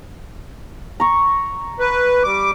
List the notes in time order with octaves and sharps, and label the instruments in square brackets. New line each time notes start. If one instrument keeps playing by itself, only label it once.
[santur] A#5 C#6
[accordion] B4
G3 D6